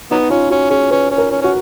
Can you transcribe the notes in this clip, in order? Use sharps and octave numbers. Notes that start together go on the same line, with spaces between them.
F#3 B3 D#4
C#4 F4
C#4 F#4
C#4 G#4
C#4 B4
C#4
A#4
C#4
C#4 F#4